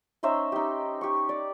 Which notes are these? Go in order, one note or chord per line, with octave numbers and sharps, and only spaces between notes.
C#4 D#4 C5 E5
D#4 G4
G4 C#6
D5